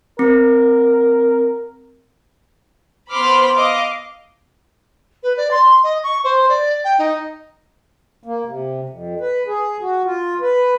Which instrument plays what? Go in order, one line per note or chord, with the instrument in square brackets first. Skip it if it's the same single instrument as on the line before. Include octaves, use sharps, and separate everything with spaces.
[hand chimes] C4 [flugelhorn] A#4
[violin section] B3 C5 B5 C6 D6 F6
D#5 F5 D6
[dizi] B4
D5
C6
D#5
C#6
C5
D5
G5
D#4
[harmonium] A#3
C3
F2
B4
G#4
F#4
F4
B4